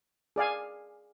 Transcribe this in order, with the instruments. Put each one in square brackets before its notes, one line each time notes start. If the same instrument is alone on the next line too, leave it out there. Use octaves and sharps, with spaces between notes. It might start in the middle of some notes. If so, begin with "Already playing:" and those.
[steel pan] G#4 D5 F5 G#5